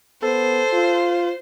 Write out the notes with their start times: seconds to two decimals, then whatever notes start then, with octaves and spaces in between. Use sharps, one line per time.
0.23 B3 A4 C5
0.74 F4